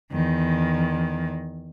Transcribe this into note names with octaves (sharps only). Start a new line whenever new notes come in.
E2 D#3